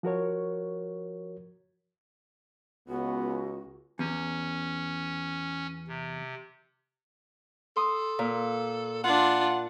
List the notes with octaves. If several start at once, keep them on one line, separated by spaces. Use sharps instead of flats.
F3 F#4 A#4 C#5
C#2 B3 F#4
E2 C#4
C3
A4 C6 D#6
A#2
D4 F4 F#5